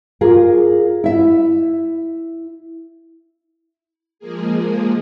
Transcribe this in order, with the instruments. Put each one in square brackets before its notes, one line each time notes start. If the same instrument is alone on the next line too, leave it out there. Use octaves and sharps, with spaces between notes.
[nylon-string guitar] F4 G#4 A#4
E4 E5
[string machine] F3 G#3 A#3 G#4